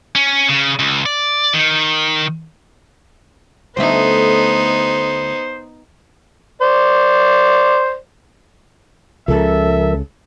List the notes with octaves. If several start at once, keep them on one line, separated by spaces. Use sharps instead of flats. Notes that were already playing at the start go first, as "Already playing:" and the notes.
C#4
C#3
C#2
D5
D#3
D2 A3 B3 D#4 C5 E5
C5 D5
C#2 C#3 F3 A4 A#4 E5